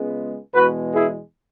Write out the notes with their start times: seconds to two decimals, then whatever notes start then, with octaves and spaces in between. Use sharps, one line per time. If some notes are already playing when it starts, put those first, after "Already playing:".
Already playing: C#2 C#3 G#3 B3
0.54 E2 B2 G#3 F#4 B4
0.94 E4 G#4